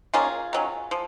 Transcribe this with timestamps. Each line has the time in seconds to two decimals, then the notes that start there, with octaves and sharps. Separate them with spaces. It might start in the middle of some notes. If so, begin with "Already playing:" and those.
0.14 D#3 A#3 C#4 F4 G#4
0.53 D#3 F#3 C#4
0.91 F3